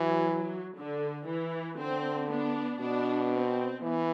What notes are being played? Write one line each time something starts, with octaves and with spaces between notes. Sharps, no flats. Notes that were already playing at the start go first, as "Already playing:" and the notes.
Already playing: E3 F#3
D3
E3
D3 C4
B3 D4
B2 B3 D4
C4
E3 B3